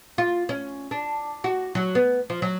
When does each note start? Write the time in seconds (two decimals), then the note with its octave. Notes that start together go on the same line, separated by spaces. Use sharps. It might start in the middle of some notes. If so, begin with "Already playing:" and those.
0.18 F4
0.49 C#4
0.91 D4
1.44 F#4
1.75 F#3
1.95 B3
2.30 F3
2.42 F#3